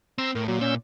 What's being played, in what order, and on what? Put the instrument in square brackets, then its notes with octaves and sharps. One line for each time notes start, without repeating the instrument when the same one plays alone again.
[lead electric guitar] C4 [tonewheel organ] A#5 C6 E6
[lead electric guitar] A2 [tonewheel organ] A#4
[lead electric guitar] A#2 [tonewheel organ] F#3
[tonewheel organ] C#4 E6 G6